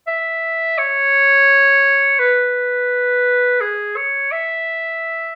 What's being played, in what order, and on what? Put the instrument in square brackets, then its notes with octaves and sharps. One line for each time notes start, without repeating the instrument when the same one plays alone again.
[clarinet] E5
C#5
B4
G#4
C#5
E5